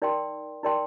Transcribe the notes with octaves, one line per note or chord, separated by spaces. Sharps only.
D#4 A#4 D5 G5 C6
D#4 A#4 D5 G5 C6